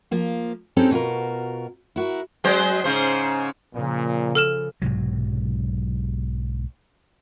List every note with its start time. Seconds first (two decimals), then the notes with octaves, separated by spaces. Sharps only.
0.11 F3 A#3 F4
0.76 G#3 C4 C#4 D#4 G4 A4
0.91 B2 F4 F#4 A#4
1.96 E4 F#4 A#4
2.44 F#3 G#3 C5
2.84 G#2 C#3 C5
3.75 A#2 C#3 F3
4.35 A4 F6 E7
4.82 B1 G#2 C3 F#3